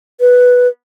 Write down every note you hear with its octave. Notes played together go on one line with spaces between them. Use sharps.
B4